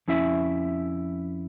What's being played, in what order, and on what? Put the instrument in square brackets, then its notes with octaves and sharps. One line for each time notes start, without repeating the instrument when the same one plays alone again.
[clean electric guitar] F2 C#4 E4 E5